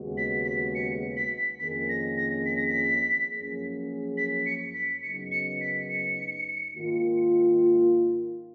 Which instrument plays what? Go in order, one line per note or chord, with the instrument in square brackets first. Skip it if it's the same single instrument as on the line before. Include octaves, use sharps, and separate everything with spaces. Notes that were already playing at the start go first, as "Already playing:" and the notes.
Already playing: [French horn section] D#2 C#3 G#3 B3 F#4
[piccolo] B6
B6
C#7
B6
[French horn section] F2 D#3 A#3 C#4 G#4 [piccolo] B6
[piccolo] A#6
A#6
B6
A#6
B6
[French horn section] F#2 F3 A#3 C#4 G#4
[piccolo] B6
C#7
B6
[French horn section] F#2 C#3 F#3 B3 D#4 [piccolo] C#7
[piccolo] C#7
B6
C#7
[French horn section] G#2 D#3 A#3 F4